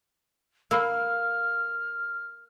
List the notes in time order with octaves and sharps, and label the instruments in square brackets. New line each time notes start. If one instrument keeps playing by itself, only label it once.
[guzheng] A#3 [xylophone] F5 B5 E6 [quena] F6